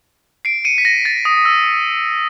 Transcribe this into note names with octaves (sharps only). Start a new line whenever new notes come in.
C7 D7
C#7 D#7
B6
A#6
A6
D#6
E6